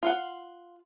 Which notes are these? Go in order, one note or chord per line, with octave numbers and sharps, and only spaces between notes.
F4 F5 F#5